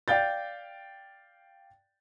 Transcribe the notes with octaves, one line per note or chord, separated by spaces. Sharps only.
D5 F5 G5 G6 A6